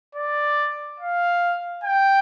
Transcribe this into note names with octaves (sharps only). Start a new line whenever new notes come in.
D5
F5
G5